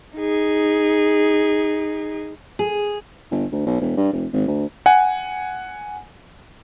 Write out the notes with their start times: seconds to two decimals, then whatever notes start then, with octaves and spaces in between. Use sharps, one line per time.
0.17 D#4 G#4
2.59 G#4
3.31 G1
3.52 D2
3.66 B1
3.81 E1
3.97 G2
4.13 F1
4.33 G#1
4.47 D2
4.86 F#5 G#5